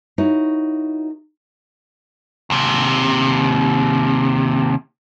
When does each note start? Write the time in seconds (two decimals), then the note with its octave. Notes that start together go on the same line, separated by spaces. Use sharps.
0.18 D#4 E4 F#4 A#4 C#5
2.50 D#2 C3